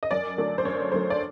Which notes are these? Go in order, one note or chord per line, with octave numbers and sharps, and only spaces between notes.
D#5
F#2 D5
D3 F#3 A3
C5
F#2 C#5
D3 F#3 A3 C5
D5